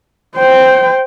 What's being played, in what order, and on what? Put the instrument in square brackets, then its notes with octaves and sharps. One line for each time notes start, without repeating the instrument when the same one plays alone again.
[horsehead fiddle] C5 G5